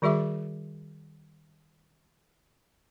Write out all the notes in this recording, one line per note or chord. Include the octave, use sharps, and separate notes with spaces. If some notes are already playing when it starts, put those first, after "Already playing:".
D#3 G3 F#4 G#4 E5 D6